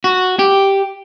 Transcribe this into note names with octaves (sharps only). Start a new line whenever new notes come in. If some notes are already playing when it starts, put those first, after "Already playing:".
F#4
G4